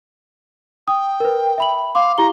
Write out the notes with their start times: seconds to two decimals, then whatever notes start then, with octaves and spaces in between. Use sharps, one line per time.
0.88 G5 D#6
1.20 A#4 B4
1.58 E5 B5 F#7
1.95 F5 C6 D6
2.18 E4 G4 A#5 G7